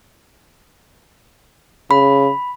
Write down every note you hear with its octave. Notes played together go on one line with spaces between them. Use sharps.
C#3 B5